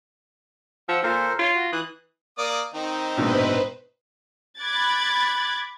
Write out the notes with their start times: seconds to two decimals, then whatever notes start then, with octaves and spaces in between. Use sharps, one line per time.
0.89 F3 F#5 E6
1.03 A#2 A4 A#4 C5
1.39 F4 C#5
1.55 F#4
1.72 E3 D#6 F#6
2.38 A#3 D5 D#6
2.74 D#3 C4 D#4
3.17 A#1 G#2 B2 B4 C5
4.59 B5 D6 F#6 G#6 A6